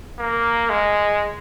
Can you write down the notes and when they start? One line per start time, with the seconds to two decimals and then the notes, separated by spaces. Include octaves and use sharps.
0.19 A#3
0.69 G#3